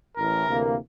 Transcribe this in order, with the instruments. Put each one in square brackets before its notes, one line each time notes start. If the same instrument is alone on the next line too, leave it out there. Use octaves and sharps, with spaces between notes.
[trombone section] A1 A2 E3 [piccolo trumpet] A#4
[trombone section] D2 C3 E3 A#3